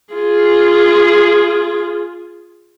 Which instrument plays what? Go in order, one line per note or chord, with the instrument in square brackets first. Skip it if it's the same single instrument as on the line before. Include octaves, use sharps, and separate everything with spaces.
[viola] F4 G#4